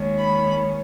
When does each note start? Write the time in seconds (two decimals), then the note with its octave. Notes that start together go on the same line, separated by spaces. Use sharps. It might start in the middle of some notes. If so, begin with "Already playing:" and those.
Already playing: D#2 D#3 G#3 C#4
0.17 B5